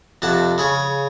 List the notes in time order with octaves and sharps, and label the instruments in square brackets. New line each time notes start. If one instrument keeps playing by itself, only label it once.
[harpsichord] F2 C3 F#5 A5
C#3 G#4 B5 C#6